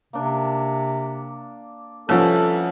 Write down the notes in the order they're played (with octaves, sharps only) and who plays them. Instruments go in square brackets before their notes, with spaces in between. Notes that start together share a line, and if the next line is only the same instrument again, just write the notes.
[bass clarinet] C3 [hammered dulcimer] A#3 D4
[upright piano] C2 F3 [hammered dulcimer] E3 C#4 [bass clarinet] A4